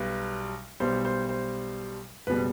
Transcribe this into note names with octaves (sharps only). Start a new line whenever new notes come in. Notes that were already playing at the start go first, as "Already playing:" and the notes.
Already playing: B1 B2 G3 B4
B1 B2 G3 C5
C5
C5
F#1 B2 G3 B4